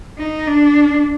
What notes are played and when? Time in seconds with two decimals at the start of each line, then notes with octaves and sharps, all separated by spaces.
0.18 D#4
0.47 D4